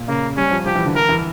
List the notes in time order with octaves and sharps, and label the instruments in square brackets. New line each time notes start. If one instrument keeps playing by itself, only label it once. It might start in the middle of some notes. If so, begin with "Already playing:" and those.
Already playing: [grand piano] A#2
[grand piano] C#3 [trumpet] A#3
[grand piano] G3 [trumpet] C#4
[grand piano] F3
[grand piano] F3 [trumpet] G4
[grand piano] E3
D3
[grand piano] E3 [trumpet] A#4
[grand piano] E3